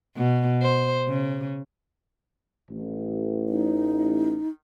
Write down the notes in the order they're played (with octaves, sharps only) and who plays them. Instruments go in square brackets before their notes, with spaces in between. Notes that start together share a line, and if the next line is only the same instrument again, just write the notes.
[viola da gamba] B2
C5
C#3
[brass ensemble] A1
[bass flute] D#4